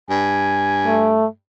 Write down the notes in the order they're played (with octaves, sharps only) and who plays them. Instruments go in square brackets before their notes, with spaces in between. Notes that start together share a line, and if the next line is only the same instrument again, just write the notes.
[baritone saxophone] G2 [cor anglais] G#5
[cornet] A3